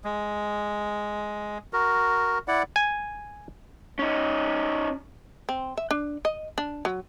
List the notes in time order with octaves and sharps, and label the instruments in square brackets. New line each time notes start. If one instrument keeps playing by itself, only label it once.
[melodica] G#3
F#4 A#4
E4 D5 F#5
[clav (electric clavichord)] G#5
[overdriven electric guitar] C#4 D#4
[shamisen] C4
E5
D4
D#5
D4
F#3